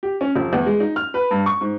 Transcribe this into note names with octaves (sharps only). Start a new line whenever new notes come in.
G4
C#4
F1
E2
G#3
D#4
F6
B4
G2
C#6
G#2